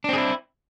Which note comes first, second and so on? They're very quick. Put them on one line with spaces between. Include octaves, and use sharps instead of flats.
D4 C4 G#4 E4